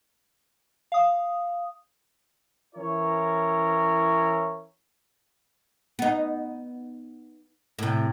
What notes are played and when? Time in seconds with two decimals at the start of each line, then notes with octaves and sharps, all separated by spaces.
0.92 F5 D#6
2.75 E3 C#4 E4 A#4 C#5
5.99 B3 D#4
7.79 A2 C3